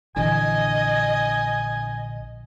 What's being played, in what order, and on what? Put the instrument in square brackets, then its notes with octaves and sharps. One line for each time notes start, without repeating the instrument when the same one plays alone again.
[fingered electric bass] A#1 D3 E3 [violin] D#5 [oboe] G#5